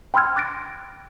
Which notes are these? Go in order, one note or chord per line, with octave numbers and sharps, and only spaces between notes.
G5 B5 C6 E6 F6 G#6
D6 F#6 A6 A#6 D7